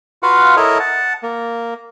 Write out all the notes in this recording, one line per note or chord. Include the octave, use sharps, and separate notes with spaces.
F4 F#4 B4 F5 F#5
E4 A4 A#4 C#5 D#5
F#5 A5
A#3